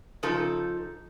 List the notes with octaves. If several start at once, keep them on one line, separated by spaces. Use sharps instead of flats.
C#3 F3 D#4 A4